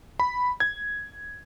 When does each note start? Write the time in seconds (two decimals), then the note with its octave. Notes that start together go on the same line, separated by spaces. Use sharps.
0.20 B5
0.60 G#6